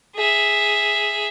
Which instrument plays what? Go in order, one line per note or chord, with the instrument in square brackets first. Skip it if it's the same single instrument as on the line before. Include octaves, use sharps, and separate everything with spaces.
[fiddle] G#4 E5